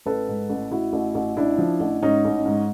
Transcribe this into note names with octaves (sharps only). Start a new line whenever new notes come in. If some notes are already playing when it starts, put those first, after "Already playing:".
A1 A4 B4
G#2
A1
A1 E4 F#4
A1
A1
A1 D4 E4
F3
A1
G#2 C#4 D#4
A1
G#2